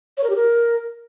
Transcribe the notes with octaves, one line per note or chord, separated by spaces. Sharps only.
C#5
A#4
G4
A#4